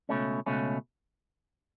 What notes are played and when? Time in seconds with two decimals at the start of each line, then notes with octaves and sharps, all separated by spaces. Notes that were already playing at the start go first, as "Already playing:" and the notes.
0.09 C#2 B2 A3 C#4
0.46 C#2 B2 A3 C#4